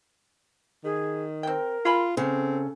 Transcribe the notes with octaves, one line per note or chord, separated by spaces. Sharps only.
D#3 G#4
C4 A#4 G5
F4 G#4 B5 C6
C#3 C4 A4